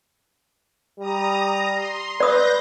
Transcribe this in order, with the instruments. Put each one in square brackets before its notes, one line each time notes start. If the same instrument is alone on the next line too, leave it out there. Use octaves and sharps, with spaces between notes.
[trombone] G3 [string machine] A#5 D#6
[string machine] C6
[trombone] B4 [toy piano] D5 D#6 [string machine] G6 A#6